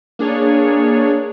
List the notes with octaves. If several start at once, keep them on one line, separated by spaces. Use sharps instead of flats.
A#3 D4 G#4 C#5